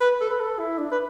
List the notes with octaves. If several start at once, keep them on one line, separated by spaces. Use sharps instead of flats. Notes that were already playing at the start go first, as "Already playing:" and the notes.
B4
A4
B4
A4
E4
D4
B4